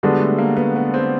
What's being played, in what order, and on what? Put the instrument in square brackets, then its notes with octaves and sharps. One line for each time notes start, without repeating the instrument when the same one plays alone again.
[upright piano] D3 G3 B3 D4 F#4 [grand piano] G#3
[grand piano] A3
A#3
B3
B3
C4